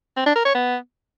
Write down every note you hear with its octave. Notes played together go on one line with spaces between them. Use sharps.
C4
D4
A#4
C#5
B3